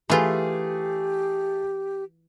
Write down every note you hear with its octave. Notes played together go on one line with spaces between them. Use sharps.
E3 A3 F4 G4 G#4